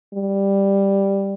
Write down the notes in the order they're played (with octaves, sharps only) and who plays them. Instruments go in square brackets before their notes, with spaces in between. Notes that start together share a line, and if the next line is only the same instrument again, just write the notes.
[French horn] G3